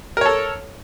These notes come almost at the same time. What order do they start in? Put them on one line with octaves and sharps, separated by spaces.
A#4 C#5 A4